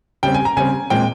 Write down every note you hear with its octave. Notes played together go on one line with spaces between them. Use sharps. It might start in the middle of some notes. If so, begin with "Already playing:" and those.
C#3 G3 C4 G5
G#5
A#5
C#3 G3 C4 G#5
A#2 G#3 C4 G5